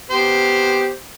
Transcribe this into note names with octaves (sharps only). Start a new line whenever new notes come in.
B3 G4 C5